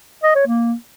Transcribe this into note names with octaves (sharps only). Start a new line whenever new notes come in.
D#5
C#5
A#3